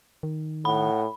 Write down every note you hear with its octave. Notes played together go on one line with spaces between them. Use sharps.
D#3
A2 F#5 B5